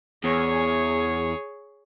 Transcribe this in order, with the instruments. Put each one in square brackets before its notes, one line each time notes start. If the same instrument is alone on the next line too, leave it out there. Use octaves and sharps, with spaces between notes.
[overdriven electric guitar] E2 [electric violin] G#4 C#5